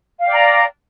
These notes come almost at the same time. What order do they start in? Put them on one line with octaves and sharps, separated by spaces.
F5 G5 D5 A#5